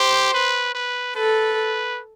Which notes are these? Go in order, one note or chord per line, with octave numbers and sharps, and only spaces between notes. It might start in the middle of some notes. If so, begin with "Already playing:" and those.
Already playing: G4 C5
B4
B4
A4 B4